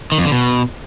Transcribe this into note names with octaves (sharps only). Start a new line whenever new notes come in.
D#3
F2
D3
B2